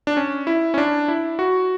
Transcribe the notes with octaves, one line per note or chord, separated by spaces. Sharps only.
D4
C#4
E4
C#4
D4
E4
F#4